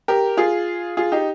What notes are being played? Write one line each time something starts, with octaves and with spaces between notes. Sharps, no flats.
G4 A#4
F4 G#4
F4 G#4
D#4 G4